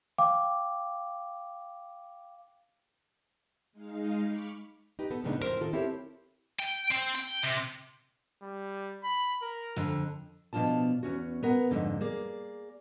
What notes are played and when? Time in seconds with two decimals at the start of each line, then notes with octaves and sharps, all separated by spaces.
0.18 F5 G5 D6
3.73 G#3 D#4 F5
4.22 B5 C#6 D6 F6
4.99 D#4 G4 B4
5.11 B3 A4
5.24 A2 C#3 G#3 B3 D4 D#4
5.39 F2 A2 C4 C#4 A#4 C5
5.61 D#3 F4 A4
5.73 C4 E4 G4 A4 A#4 C#5
6.60 G5
6.92 C4
7.15 G5
7.43 C3
8.42 G3
9.04 B5
9.42 A#4
9.76 F2 D3
10.53 B2 F3 D4 F4 A5
11.03 E2 C#4 F#4
11.43 B3 A#4 F#5 G#5
11.71 F2 G#2 D3
12.01 A#3 G#4 D5